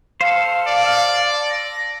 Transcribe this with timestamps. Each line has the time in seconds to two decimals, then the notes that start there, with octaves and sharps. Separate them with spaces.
0.21 A4 C5 F5
0.67 D5
1.50 A#6